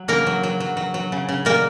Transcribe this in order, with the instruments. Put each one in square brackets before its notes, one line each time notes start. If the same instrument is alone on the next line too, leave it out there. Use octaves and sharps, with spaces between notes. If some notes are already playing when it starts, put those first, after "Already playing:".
Already playing: [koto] F#3
C#3 A#3 A#4
F#3
F#3
F#3
F#3
F#3
C#3
C#3
A#2 A#3 A#4